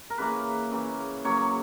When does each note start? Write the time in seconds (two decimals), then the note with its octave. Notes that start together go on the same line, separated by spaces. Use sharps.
0.10 A#4
0.18 C#3 E3 A#3 B4
0.72 C#3 E3 A#3
1.24 C#3 F#3 A#3 C#5